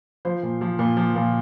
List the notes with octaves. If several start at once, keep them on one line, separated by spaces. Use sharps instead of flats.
F3 C5
A#2
F3
A#2
F3
A#2